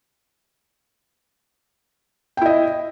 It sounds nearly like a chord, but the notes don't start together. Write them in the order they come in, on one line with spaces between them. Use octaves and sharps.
G5 E4 D#5